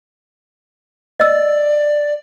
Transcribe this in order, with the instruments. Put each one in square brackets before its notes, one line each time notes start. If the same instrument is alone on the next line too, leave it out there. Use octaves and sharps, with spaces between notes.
[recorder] D5 [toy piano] D#5 E6